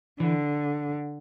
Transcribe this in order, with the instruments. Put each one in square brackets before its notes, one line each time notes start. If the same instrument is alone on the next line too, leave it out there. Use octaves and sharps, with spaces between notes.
[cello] D3 [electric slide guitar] E3